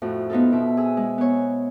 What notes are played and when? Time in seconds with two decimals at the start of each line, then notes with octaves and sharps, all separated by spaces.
0.02 F2 A2 F#4
0.30 B3 D#4 F4 A4
0.52 B2 C4 E5
0.77 G#4 E6
0.97 G#3
1.18 B3 C#5